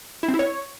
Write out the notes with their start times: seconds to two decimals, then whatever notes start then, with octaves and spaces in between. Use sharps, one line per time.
0.23 E4
0.28 C4
0.34 E4
0.39 C#5